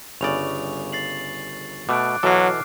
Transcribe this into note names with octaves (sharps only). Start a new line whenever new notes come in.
G1 C#3 D5 C#6 F7
A6 C7 F#7
B2 A3 D6 F#6 D7
B2 E3 F#3 A4 D6 F6 C7